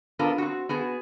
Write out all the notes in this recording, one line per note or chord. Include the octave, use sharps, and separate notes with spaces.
B3 D4 F4 A4 A#4 D5
C4 F#4
B3 F#4 G#4